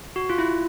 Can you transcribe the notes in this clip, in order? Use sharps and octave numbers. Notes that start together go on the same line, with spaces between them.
F#4
F4
E4